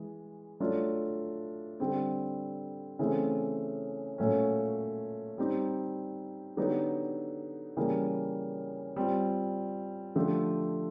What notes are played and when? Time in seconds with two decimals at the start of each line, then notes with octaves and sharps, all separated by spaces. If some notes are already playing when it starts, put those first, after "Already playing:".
Already playing: E3 G#3
0.60 F#3 A3 D4 F4
1.80 D3 G3 C4
2.99 C#3 E3 A3 C4
4.18 A#2 F#3 A3 C#4
5.38 G3 C4 D#4 G4
6.57 D3 F#3 B3 D#4 G4
7.77 C#3 E3 G3 A#3
8.96 G3 C4 F4
10.15 D3 F3 A3 D4 G4